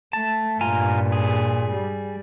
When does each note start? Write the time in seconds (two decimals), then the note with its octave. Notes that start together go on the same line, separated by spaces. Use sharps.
0.13 A3 A5
0.61 G2 A#2 F4 G#5 A#5
1.12 G#4
1.73 G3